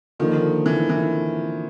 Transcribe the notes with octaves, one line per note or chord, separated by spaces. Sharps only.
D3 D#3 F3 A#3 D#4
E3
E3